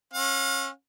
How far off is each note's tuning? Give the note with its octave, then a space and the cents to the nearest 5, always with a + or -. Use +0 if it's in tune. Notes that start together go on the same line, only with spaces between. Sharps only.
C#4 -30 F5 +40